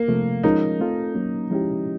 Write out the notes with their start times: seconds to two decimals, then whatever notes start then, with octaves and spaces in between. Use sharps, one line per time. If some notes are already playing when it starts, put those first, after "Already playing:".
Already playing: A#3
0.08 C3 F3 A3
0.43 F3 G#3 C#4 D#4 F4 A#4
0.80 A3 C4 F4 A4
1.15 F#3 A#3 C#4
1.51 F3 G#3 C#4 E4 G4